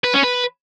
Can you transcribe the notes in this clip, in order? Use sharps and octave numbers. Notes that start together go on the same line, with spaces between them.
B4
C#4
B4